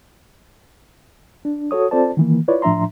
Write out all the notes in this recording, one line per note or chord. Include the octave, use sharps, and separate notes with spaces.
D4
F#4 A4 C#5 D#6
C4 F4 A4 C5 D5 A5
D#3 E3 A#3
E4 F4 B4 C#5 D5
A2 F3 D4 E5 A#5 C6